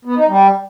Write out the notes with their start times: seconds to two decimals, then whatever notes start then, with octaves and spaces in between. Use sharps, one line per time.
0.05 B3
0.16 D#4
0.28 G3